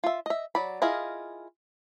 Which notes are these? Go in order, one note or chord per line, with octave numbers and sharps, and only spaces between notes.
F4 E5
D#5 E5
F#3 D5 B5
E4 F4 G#4 A#4 D#5